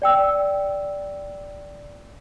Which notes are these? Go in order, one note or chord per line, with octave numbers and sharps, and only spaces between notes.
D5 G5 E6